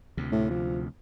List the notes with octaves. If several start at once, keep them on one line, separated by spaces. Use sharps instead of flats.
D2 C3
A2
F3